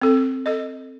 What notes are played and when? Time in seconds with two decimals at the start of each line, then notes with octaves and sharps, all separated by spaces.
0.02 C4 A4
0.46 A4 D#5